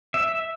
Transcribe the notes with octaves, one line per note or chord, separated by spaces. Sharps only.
E5